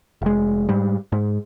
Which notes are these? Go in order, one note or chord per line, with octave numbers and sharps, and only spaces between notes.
F1 G#3
G#2 G3
G#2